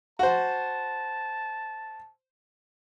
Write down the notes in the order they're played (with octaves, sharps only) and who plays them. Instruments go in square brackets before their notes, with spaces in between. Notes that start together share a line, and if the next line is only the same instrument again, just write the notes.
[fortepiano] F#4 C5 [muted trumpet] A5